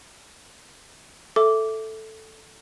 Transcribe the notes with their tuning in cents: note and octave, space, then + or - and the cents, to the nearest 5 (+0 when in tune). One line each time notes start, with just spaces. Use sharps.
A4 +0 E5 +0 D6 -10